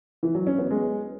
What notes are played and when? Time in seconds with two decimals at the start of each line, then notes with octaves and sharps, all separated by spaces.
0.23 E3
0.35 F#3
0.47 C#4
0.59 B3
0.71 G#3